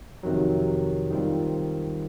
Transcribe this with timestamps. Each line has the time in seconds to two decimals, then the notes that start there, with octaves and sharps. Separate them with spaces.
0.23 F2 C3 D#3 F#3
1.10 D#3 G3 C4 F4